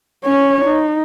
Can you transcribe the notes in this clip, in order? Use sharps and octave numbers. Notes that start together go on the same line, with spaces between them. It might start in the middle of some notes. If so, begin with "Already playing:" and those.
C#4 C#5
D#4